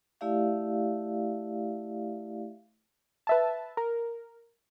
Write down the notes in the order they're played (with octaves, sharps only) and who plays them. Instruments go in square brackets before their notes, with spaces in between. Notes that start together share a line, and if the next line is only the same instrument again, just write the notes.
[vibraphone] A3 E4 G4 D5 E5 F5
[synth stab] B4 E5 A5
A#4